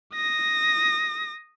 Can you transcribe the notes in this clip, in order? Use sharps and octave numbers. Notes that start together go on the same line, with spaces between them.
D#6 A#6